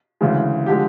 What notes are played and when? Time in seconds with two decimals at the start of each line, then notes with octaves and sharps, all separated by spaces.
0.21 D2 C#3 E3 G#3
0.66 D3 F3 G#3 G4